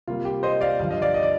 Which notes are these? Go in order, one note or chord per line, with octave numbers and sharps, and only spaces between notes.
C3 G3 A#3 F4
G4
C5 D#5
D5 F5
G2 D3 F3 F5
D#5
D5 F5
D#5
D5